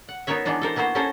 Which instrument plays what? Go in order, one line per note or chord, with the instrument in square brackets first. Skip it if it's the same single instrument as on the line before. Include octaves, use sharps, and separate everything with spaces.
[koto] F#5
B3 D#4 F#4 A#4 C#5 E5
E3 G#3 B3 D4 D#4
A4 A#4 C5
A#3 B3 E4 F#4 C5
C#4 E4 A4 A#4 C5 G#5